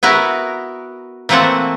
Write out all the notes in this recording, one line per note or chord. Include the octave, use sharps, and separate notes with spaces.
B3 E4 F#4 A#4
E3 A3 A#3 C4 F#5 A5